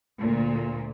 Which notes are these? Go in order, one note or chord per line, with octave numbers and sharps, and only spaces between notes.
D2 A#2